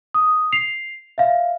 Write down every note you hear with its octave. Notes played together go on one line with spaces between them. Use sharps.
D#6
C7 F7
E5 F5